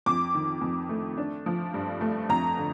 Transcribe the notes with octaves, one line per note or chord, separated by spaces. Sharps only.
F2 D6
D#3
F2
A3
D4
F3
G2
A3
F2 A#5
D3